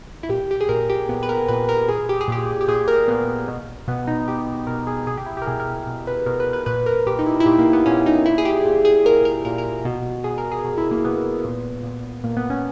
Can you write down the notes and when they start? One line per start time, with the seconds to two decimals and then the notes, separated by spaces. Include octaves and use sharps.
0.23 E4
0.29 A#2 G4
0.51 G4
0.61 G#4
0.69 A#2 A#4
0.90 G4
1.09 A#2 B3
1.23 B4
1.29 A#4
1.48 A#2 B4
1.69 A#4
1.88 A#2 G#4
2.09 G4
2.21 G#4
2.28 A#2 G4
2.61 G4
2.68 A#2 G#4
2.88 A#4
3.08 A#2 B3
3.48 B2
3.88 B2 B3
4.07 D#4
4.27 B2 G4
4.67 B2 A#4
4.87 G#4
5.07 B2 G#4
5.17 G4
5.26 E4
5.37 G4 A#4
5.46 B2 G#4
5.60 A#4
5.87 B2
6.07 B4
6.26 B2 A#4
6.40 B4
6.53 B4
6.66 A#2 B4
6.86 A#4
7.06 A#2 G4
7.19 D#4
7.26 E4
7.40 E4
7.46 A#2 G4
7.59 A#3
7.73 B3
7.86 A#2 C#4
8.06 D#4
8.26 A#2 E4
8.38 G#4
8.45 G4
8.66 A#2
8.85 G#4
9.05 A#2 A#4
9.25 A#4
9.45 A#2 A#4
9.58 A#4
9.85 B2
10.24 B2 G#4
10.38 A#4
10.52 G#4
10.64 B2
10.78 E4
10.91 A#3
11.05 B2 B3
11.45 A#2
11.83 A#2
12.24 A#2 A#3
12.37 B3
12.50 C#4